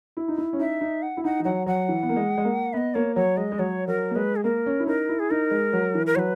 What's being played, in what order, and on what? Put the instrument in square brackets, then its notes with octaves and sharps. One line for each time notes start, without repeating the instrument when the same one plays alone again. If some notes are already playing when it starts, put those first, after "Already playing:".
[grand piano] E4
D#4
E4
C#4
[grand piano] D#4 [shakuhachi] E5
[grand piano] D#4
[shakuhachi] F#5
[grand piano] E4
[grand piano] D#4 [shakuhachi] F#5
[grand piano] E3
[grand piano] F#3 [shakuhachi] F#5
[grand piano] F#3 [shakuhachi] F#5
[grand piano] E3
B3
A#3
G#3
G#3
A#3
[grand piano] B3 [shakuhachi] D#5 E5
[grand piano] A#3 [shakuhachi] C#5
[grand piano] F#3 [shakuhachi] C#5
[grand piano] G#3 [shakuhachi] D#5
[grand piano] G#3
[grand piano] F#3 [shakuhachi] C#5
[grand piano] F#3 [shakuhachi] A#4
[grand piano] A#3
[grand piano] G#3 [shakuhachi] B4
[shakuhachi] G#4
[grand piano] A#3 [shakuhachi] A#4
[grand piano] C#4
E4
[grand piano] D#4 [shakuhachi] A#4
[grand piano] E4
[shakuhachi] G#4
[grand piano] D#4 [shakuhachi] A#4
[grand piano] G#3
F#3
E3
[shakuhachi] A#4
[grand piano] F#3 [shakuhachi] B4 C#5